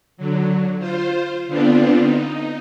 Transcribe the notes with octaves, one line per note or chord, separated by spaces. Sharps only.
D3 F#3
F4 C5
D3 B3 C4 D4 F4
D#4